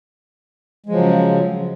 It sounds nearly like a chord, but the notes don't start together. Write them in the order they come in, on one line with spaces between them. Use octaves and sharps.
G#3 F3 F#3 C#3